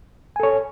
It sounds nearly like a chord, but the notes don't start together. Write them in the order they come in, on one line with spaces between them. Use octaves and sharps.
G#5 A4 C#5